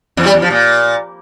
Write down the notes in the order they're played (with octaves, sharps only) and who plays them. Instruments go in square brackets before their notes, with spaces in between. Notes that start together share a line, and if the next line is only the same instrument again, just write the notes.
[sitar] E2
G3
E2
F3
A#2